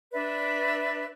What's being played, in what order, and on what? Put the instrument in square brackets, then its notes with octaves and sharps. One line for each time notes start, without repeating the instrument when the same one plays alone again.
[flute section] D4 B4 D5 E5